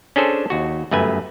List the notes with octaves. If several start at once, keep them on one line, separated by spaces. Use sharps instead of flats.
C#4 D4 G#4 A4 C5
D#2 F#4
G1 F#2 A3 B4 G#5